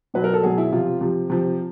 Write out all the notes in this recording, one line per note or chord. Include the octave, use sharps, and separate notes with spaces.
B2 F#3 B4
A#4
A4
B2 F#3 G#4
E4
C3 F3 F4
C3 F3
C3 F3